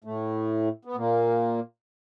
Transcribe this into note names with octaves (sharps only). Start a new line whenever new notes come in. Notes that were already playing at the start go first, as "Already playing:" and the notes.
A2 A3
B3
A#2 A#3